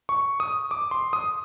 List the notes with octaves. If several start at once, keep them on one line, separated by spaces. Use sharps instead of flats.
C#6
D#6
D6
C6
D#6